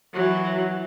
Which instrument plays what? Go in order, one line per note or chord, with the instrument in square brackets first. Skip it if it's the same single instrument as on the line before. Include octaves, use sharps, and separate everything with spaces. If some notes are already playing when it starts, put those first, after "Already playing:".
[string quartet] E3 F#3